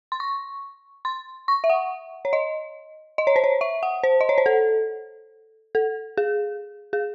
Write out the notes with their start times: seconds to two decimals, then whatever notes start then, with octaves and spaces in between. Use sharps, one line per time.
0.12 C6
0.20 C#6
1.05 C6
1.48 C#6
1.64 E5
1.70 F#5
2.25 C#5
2.33 D#5
3.18 D#5
3.27 C#5
3.36 C5
3.44 C#5
3.61 E5
3.83 F#5
4.03 C5
4.21 D#5
4.29 C#5
4.38 C5
4.46 A4
5.75 A4
6.17 G#4
6.93 G#4